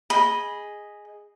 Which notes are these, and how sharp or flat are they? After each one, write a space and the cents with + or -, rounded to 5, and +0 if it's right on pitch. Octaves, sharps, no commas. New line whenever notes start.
G#4 -5 D#5 +0 B5 -10